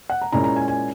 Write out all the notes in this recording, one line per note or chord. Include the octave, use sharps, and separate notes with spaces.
F#5
A#5
A#2 G#3 C#4 E4 A#5
A#5
G#5
G#5